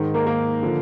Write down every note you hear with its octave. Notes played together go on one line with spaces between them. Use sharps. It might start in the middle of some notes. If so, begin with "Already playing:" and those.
Already playing: G#2 D#3
A#3 A#4
A#3 A#4
D3 F3